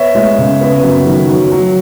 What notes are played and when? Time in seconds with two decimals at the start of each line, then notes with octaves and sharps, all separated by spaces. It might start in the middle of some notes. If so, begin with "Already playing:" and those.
Already playing: B3 C#5 E5
0.15 G#3
0.38 C#3
0.61 B3
0.83 F#2
1.06 D#3
1.29 F#3
1.52 F#3